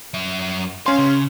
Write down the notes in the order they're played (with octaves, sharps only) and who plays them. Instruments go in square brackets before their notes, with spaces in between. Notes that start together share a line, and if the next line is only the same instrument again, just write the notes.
[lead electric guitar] F#2 E5
[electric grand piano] C#4 C6 [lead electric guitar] F5
[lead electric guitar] C#3